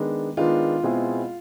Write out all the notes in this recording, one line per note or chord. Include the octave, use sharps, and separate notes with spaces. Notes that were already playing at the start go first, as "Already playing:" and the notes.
Already playing: D#3 G#3 B3 D4
D#3 G#3 B3 D4 F4
B2 G#3 C4 E4 G#4